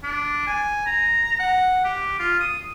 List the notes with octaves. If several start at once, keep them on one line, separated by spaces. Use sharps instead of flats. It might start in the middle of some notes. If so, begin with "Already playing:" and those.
D4
G#5
A#5
F#5
G4
F4
D#6